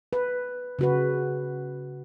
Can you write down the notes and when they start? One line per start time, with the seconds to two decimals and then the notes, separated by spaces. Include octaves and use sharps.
0.13 B4
0.79 C#3 F#4 B4